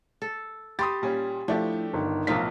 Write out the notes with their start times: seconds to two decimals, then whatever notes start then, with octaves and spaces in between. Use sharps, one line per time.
0.22 A4
0.79 G4 B5 C6 D#6 A6
1.02 A#2 G3 C#4
1.48 A2 F3 A3 D4 G4
1.94 G1 D#3
2.27 B1 A2 F3 D#4 F4 A#4 B6